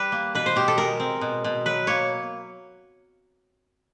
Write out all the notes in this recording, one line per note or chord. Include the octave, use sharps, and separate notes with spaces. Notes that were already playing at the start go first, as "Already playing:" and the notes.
Already playing: G3 B4
A#3
B2 B4
C5
B2 G4
A4
G#3 A#4
C4
B2
B2
F#3 B4
A#3 C#5